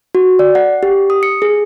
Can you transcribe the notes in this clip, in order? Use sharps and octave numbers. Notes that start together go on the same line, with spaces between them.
F#4
D5
F#5
G4
D#6
C#7
G#4